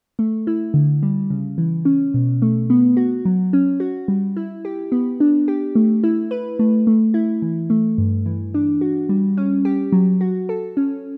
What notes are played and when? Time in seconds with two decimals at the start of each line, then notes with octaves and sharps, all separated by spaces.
0.19 A3
0.47 E4
0.74 D3
1.03 G3
1.30 C#3
1.58 E3
1.85 C#4
2.14 B2
2.42 A3
2.70 B3
2.97 F#4
3.25 F#3
3.53 C#4
3.80 F#4
4.08 G3
4.36 E4
4.65 G4
4.92 B3
5.20 D4
5.48 G4
5.75 A3
6.04 E4
6.31 B4
6.59 A3
6.87 A3
7.14 E4
7.42 E3
7.70 A3
7.98 G2
8.26 E3
8.54 D4
8.81 F#4
9.09 G3
9.37 C#4
9.65 G4
9.92 F#3
10.21 F#4
10.49 A4
10.77 C#4